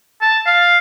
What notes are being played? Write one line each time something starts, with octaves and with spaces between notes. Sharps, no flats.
A5
F5